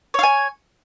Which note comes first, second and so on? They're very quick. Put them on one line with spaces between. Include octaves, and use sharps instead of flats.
C#5 F5 G#5